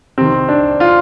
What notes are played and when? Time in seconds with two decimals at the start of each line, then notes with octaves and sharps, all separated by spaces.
0.18 C3 D#3 C4
0.49 D4
0.80 F4